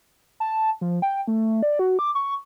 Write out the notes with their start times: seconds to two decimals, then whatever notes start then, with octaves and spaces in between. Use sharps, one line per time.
0.40 A5
0.81 F3
1.02 G5
1.27 A3
1.62 D5
1.79 F#4
1.99 D6
2.15 C#6